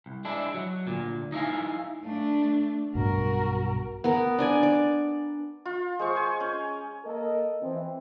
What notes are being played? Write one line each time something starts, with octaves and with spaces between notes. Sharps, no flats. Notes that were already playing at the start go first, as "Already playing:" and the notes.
C2
G#3 D4 E4
F#3
D2 A#2
D#4 E4 F5 G#5
A3 D4
B1 G2 B2 F#4 A#4
B3 A#4
D4 D5 G#5
D5
F4
G#3 C5 C#6
C5 G#5
C#4
A#3 A4 A#4 D#5
E3 C4